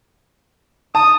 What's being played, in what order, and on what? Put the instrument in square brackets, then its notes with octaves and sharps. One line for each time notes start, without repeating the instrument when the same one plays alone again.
[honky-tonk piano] A5 [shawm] D#6